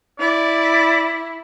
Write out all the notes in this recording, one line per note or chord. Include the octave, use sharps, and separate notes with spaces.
E4 D5